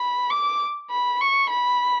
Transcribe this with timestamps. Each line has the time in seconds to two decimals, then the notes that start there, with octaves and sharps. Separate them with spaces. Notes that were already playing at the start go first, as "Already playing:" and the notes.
Already playing: B5
0.30 D6
0.90 B5
1.21 C#6
1.49 B5